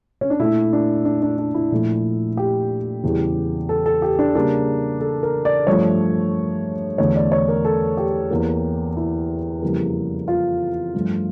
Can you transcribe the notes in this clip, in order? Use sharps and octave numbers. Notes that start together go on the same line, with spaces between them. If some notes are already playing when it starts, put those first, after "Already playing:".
C#4
D4
A#2 A3 E4
D4
D4
D4
D4
E4
A#2 F3 A3
G4
E2 C#3 E3 G3
A4
A4
G4
D4
C#3 G3 A#3 D4
A4
A#4
D5
G2 F3 A3 C#5
E2 D3 A3 C#5
D5
C#5
A#4
A4
G4
E2 E3 A#3
E4
F2 C#3 E3 G3 A#3
F4
G2 F3 A3